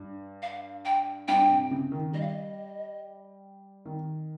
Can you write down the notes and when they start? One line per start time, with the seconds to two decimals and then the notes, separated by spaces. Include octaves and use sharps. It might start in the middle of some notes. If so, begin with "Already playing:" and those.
Already playing: G2
0.42 F5
0.85 G5
1.28 G2 G5
1.49 C3
1.71 C#3
1.92 D#3
2.13 G3 D#5
2.21 F5
2.28 D#5
3.85 D#3